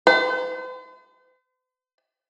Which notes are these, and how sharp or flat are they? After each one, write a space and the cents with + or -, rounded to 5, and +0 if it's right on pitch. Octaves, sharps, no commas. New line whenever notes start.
C5 -45